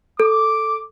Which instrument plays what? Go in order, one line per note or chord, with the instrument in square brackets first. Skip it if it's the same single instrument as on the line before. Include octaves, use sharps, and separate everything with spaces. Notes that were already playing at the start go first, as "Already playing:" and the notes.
[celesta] A4 [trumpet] D6